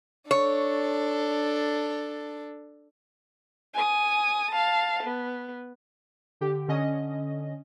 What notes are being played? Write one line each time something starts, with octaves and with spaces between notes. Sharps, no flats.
D4 A4 C#5
G#5 D#6
F5 A5
B3
D3 G4
D3 C#4 D#5